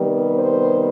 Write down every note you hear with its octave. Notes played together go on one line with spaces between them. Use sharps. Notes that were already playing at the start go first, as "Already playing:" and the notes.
Already playing: C3 D#3 G3 B3
C5